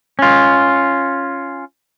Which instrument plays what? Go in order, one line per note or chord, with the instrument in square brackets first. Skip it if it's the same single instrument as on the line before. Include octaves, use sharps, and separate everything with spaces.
[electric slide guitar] C#4 F4